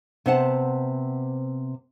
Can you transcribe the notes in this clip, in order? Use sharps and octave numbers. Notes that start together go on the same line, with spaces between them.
C3 B3 C5 F#5 A5